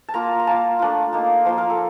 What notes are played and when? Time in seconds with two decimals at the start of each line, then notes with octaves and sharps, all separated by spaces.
0.09 A5
0.14 A#3 F4 A#5
0.40 A#5
0.47 A#3 F4 A5
0.79 A3 D4 F4
1.13 A#3 D#4
1.45 F3 A#3 F4 C5
1.58 A#4
1.70 A4